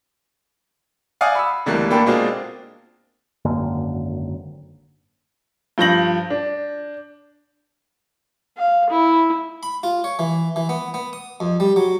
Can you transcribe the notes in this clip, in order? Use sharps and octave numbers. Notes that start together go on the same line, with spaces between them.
D5 F5 F#5 G#5 D#6
B5 E6
C#2 D3 E3 G3 A3 A#3
A#2 A#3 D4 A4 G5 B5
B2 G#3 A#3 C4 D4 F4
G#1 F#2 D3 A#3
G2 F3 G6 A#6 F#7
D4
F5
E4
B5
F4
C#5
E3
E3
B3
B3
D#6
F2
G3
F#3